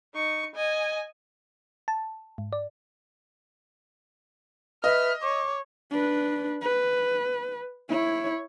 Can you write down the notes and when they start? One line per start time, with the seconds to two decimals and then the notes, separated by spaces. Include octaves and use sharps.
0.14 D#4 C#6
0.55 D#5 G#5
1.88 A5
2.38 G#2
2.53 D5
4.84 B4 D#5 E5 F6
5.23 C#5 D6
5.91 D4 B4
6.62 B4
7.89 E4 C#5